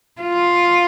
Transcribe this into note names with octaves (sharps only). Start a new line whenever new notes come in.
F4